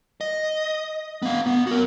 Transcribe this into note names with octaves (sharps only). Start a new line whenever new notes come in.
D#5
B3 F5
B3
F#4 A#4